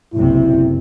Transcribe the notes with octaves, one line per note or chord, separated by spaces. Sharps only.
F#1 B1 C3 E4